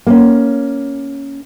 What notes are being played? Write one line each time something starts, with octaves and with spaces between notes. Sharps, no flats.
A#3 C#4